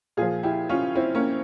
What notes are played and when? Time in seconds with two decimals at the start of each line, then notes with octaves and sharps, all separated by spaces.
0.17 A#2 F3 F4 G#4
0.43 E4 G4
0.69 C#4 F4
0.95 C4 E4
1.15 A#3 C#4